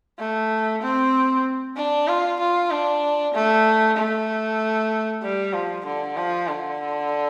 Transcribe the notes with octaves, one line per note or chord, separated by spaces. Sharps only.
A3
C4
D4
F4
F4
D4
A3
A3
G3
F3
D3
F3
D3